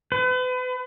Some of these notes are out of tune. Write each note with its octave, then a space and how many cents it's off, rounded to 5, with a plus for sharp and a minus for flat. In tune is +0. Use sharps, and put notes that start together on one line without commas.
B4 +40